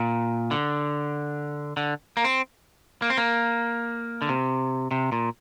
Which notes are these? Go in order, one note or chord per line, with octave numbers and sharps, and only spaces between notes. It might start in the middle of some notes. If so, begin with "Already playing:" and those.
Already playing: A#2
D3
D3
A#3
C4
A#3
C4
A#3
D3
C3
C3
A#2